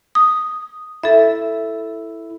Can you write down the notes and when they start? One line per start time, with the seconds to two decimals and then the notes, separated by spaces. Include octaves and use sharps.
0.15 D#6
1.03 E4 A4 E5